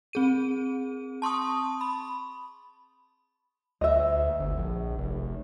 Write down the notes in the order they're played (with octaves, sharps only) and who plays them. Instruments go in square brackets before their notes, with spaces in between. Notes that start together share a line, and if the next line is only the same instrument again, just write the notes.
[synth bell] C4 G#4 D#7
A5 C6 C#6 D#6
B5
[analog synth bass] D2 [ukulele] D#5 E5
[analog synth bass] G1
A#1
F1